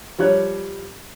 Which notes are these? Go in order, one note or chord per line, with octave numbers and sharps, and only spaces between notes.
F3 G3 C#5 F#6